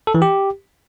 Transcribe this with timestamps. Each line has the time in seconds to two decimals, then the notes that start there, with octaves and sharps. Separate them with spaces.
0.07 A4
0.15 E3
0.22 G4